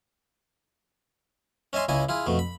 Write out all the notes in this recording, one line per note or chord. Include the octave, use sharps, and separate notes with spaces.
C#4 D#5 E5 G#5 C6
C#2 C#3 E4 D#5 G#5
E4 F4 G#4
F2 B2 A3
B5